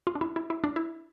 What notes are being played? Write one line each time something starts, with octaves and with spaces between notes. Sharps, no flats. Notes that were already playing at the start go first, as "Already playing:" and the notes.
F4
D4
E4
E4
E4
D4
E4